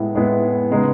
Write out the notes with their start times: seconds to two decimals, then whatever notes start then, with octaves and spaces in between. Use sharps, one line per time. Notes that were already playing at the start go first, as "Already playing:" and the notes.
Already playing: A2 G#3 B3 E4
0.15 A2 G#3 B3 E4
0.71 C#3 G#3 B3 D#4